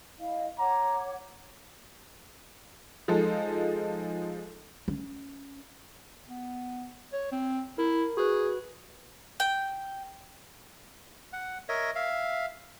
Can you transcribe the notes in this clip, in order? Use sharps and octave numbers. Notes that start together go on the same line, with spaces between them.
E4 D#5 F5
C#5 F#5 A#5 D6
F3 G#3 D#4 A4
C#4
B3
C#5
C4
E4 A#4
F#4 G#4 B4
G5
F#5
A#4 C#5 D#5 E5
E5 F5